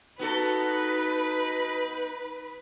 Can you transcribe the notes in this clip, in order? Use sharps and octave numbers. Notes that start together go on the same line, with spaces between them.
B3 D#4 F#4 A4 B4